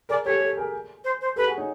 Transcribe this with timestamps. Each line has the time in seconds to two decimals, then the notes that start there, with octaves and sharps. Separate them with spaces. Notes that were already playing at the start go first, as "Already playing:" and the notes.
0.09 G#4 A#4 D5
0.25 G4 A4 C#5
0.41 G4 A4
0.57 G#4 A#4
1.04 C5
1.21 C5
1.36 G4 A4 B4
1.47 F#4 G#4
1.57 C#4 D#4